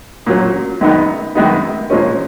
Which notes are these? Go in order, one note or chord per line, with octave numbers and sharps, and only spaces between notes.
A#2 F#3 C#4
F#2 D#3 G#3 B3 D#4
F#2 D#3 G#3 B3 D#4
A#2 F3 G#3 C#4